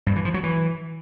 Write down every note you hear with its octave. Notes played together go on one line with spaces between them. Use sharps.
G2
E3
F3
F#3
E3